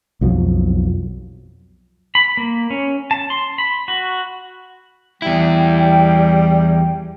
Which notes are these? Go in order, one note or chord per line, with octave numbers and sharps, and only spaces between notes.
B1 F2 F3 F#3
B5
A#3
C#4
A5
C6
B5
F#4
E2 G3 E4 G5